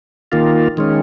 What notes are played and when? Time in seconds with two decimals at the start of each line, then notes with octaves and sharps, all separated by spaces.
0.32 D#3 A#3 F4
0.77 D#3 G#3 C#4